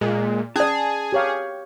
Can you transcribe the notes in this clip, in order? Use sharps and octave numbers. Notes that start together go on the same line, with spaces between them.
A#2 G#3
C#4 G#4 D5 A5
G4 C#5 F5